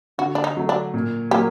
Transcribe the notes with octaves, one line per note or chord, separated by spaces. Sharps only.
D3 F#4
D4
D#4
F#3 A3
D4
A#2
F#3 A#3 G4